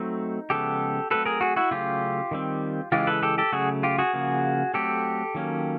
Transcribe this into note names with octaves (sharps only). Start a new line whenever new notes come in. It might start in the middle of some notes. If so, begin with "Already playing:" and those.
Already playing: F#3 A3 C4 D#4
C#3 F3 G#3 B3 G4 A4
F#3 A3 C4 A4 B4
G#4 A#4
F#4 G#4
E4 F#4
C#3 F#3 A3 C#4 F4 G4
D#3 G3 C4
C#3 E3 G#3 C#4 F4 G4
A4 B4
G4 A4
G4 A4
C#3 F#3 A3 F#4 G#4
F4 G4
F#4 G#4
C#3 F3 A#3
F#3 A3 C4 G4 A4
D#3 F#3 A#3 C#4